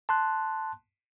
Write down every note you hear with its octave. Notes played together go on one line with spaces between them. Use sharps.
A5 C6 F#6